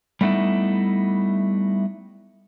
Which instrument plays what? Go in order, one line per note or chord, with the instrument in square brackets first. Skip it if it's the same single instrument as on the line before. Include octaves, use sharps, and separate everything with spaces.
[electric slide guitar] G3 A3 B3 D#4 E4